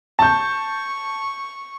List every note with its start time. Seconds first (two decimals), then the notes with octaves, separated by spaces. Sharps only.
0.19 A5 C#6 G6